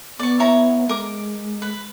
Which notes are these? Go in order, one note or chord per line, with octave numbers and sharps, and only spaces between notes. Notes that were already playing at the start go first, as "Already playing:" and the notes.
B3 D5 C#6
E4 C#5 A#5
G#3 A#4 D6
B4